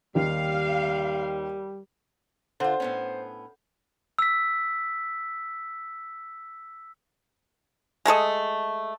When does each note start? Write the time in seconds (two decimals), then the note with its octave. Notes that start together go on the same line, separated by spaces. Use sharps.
0.15 D#2 G3 F5
2.60 D3 F4 A4 C5 F#5
2.80 A2 B3 C#4
4.19 E6 B6
8.06 G#3 A3 A4 D#5